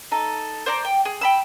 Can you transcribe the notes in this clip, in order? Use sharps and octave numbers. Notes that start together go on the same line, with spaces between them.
D#4 A4
C5 D5 A#5
G5
G#4
G5 B5 E6